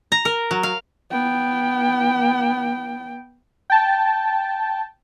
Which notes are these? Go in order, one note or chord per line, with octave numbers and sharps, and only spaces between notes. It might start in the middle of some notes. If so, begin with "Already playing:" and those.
A#5
A#4
F#3
F5
B3 G5
G5 A5